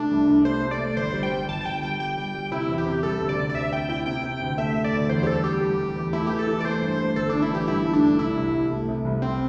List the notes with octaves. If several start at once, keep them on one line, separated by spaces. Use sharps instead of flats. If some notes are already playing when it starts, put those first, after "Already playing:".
Already playing: C3 A3 D4
C2
C2
A3 C5
A3
D5
A3
G1 C5
G3
G5
G3
G1 A5
A5
G1 G5
G3 G5
G3 G5
G3
G3
C3 E4
E2
G4
C3
G3 A4
D2
D5
C3
D5
D2 E5
C3 G5
E4 G5
C3 G5
C3
D2
A3 E5
A3
D5
D2
E2 C5
G4
G3 A4
G3 G4
G3
E2
E2
A3 E4
E3 G4
A4
E3
D5
A3 C5
G2
A3
G1 A4
A3 D4
E4
E3 G4
G2 E4
A3
D4
G2
C2 E4
C2
C2
A3
C3
C2
C3 C4